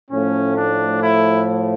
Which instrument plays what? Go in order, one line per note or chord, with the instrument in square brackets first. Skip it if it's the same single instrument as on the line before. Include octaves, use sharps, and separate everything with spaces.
[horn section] A2 F3 A3 C#4
D4
E4